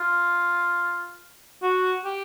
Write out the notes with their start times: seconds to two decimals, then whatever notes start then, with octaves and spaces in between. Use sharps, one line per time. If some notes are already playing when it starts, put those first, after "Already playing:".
Already playing: F4
1.62 F#4
2.04 G4